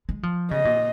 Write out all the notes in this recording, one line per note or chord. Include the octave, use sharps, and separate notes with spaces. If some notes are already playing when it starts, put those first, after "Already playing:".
G#3
F3
C#3 D#5
A#2